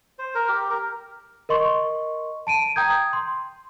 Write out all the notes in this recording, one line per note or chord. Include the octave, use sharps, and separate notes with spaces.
C5
A#4
G4
A#4
A#4 D#5 C6 C#6
A5 D7 D#7
G5 A#5 D#6 G6 G#6
C6